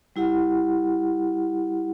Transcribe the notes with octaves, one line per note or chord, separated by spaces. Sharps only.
G3 E4 G4 F#5